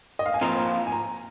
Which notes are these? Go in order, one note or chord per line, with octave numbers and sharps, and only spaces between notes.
D#5
F5
G#5
F2 F3 A#3 F4 A#5
A#5
G#5
A#5